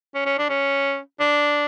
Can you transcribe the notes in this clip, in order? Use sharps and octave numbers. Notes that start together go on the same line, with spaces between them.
C#4
C#4
D4
C#4
D4